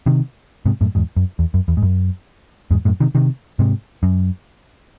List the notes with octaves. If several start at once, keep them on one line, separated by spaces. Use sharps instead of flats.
C3 D#3
G#2 C3
F#2 A2
E2 G#2
F#2
E2
F#2
E2
G#2
F#2
E2 G#2
F#2 A2
C3 D#3
C3 D#3
G#2 C3
F#2